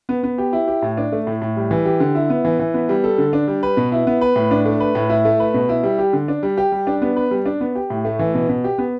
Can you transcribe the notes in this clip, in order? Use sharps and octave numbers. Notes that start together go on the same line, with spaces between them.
B3
B3
G4
E4
G4
A2
D4
A3
A2
A2
G3
E3
G4
D3
E4
B3
E3
E3
B3
G3
A4
D3
D4
G3
B4
B2
E4
B3
B4
A2
D4
A3
B4
A2
E4
A3
B4
B2
E4
G3
G4
D3
D4
G3
G4
G3
D4
B3
B4
G3
D4
B3
G4
A2
A3
E3
B2
B2
G4
B3